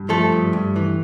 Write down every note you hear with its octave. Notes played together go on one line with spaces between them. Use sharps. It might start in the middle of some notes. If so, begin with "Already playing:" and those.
Already playing: G2
F3 A3 A4
G2
G2
E3